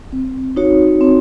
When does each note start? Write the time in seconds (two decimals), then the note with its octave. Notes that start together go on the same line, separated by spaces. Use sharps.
0.12 C4
0.56 D#4 F#4 C#5
1.01 C4